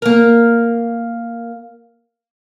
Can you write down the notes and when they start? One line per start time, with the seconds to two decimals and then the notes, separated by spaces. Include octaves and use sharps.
0.02 A#3 A#4